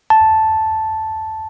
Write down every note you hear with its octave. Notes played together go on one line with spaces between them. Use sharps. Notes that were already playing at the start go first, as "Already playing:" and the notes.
A5